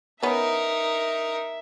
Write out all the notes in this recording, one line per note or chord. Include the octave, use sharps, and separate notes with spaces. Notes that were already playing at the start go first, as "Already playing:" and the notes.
B3 C#4 D#4 A#4 E5